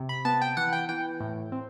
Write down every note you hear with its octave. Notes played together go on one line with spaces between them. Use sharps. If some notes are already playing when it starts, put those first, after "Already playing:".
Already playing: C3
B5
B3 A5
G5
E3 F#5
G5
E3 G5
A2
C4